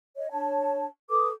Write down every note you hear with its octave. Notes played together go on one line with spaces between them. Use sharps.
C#5 D#5
D4 C#5 A5
A4 B4 D6 D#6